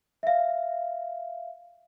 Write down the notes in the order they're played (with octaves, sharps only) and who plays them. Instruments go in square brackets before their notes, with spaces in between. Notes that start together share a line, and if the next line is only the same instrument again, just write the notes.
[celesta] E5 F5